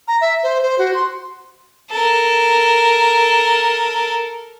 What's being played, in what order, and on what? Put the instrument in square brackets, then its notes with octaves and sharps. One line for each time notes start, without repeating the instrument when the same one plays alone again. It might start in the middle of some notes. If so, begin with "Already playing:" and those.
[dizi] A#5
E5
C5
C5
F#4
C6
[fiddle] A4 A#4